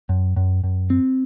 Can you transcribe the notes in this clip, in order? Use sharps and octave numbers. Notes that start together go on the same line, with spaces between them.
F#2
F#2
F#2
C4